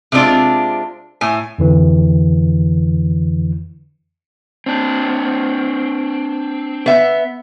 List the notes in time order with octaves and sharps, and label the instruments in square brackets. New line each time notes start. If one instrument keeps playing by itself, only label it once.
[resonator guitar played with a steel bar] C3 G#3 C4 D4 F4
A2 G#5
[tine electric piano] F2 D3 E3
[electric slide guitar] C4 D4
[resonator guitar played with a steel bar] B3 E5